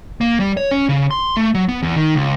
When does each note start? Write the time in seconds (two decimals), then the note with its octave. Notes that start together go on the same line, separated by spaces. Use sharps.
0.21 A#3
0.40 G3
0.57 C#5
0.71 C#4
0.89 C#3
1.11 C6
1.37 A3
1.54 F#3
1.69 B3
1.83 E2
1.96 D#3
2.15 C#2